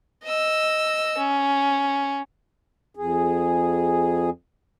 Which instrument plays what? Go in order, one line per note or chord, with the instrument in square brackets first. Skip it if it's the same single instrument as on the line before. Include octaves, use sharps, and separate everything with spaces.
[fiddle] D#5 E6
C#4
[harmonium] F2 G#4